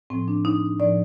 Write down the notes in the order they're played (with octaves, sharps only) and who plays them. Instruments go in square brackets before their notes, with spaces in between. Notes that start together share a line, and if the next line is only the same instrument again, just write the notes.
[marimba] A2 F3 C4
D4
D#4
A2 F3 D5